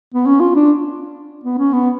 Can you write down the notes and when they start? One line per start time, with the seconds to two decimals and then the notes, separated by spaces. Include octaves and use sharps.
0.14 B3
0.26 C#4
0.40 F4
0.55 D4
1.44 B3
1.58 C#4
1.74 B3